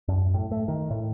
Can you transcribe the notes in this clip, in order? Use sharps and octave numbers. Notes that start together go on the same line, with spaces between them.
F#2
A2
A3
D#3
A2